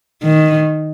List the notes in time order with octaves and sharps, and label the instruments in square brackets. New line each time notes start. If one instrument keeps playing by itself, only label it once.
[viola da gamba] D#3